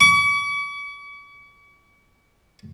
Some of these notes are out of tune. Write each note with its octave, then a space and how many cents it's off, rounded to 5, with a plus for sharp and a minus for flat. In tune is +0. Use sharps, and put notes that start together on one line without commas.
C#6 +45